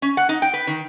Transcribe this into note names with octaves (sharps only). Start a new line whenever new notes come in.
C#4
F#5
D#4
G5
B4
D#3